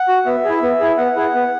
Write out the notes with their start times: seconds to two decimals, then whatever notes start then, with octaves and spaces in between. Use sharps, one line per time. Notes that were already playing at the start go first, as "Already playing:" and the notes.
Already playing: F#5
0.08 F#4
0.26 B3 E5
0.44 E4 G#4
0.62 B3
0.80 E4 G#4
0.97 B3 F#5
1.16 E4 G#4
1.34 B3